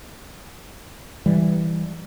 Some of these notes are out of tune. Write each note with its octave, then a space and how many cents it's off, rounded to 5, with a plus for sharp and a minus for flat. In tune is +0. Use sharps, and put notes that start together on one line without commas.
E3 +0 G3 +0